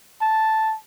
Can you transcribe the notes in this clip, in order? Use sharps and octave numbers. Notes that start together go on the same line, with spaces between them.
A5